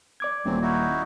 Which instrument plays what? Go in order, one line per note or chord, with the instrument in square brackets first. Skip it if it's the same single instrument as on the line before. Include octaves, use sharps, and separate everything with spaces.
[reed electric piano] D5 D6 G#6
[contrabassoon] D#1 [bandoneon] E3 F#3 C4
[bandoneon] D#4 E4 F#4